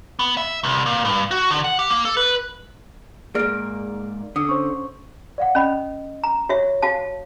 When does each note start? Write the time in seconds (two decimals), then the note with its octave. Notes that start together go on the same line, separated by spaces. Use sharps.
0.19 B3
0.37 E5
0.64 C2
0.86 A#2
1.05 G2
1.31 F#4
1.51 D3
1.64 F#5
1.79 G4
1.91 A#3
2.05 A4
2.17 B4
3.35 G#2 A#3 G#4 D5 F6 D7
4.36 D3 D#6
4.49 C#4 C5 C#6
5.38 D5 F5 F#5
5.55 C#4 D#5 B5
6.24 A#5
6.49 F#4 C#5 E5
6.82 F#4 F5 A5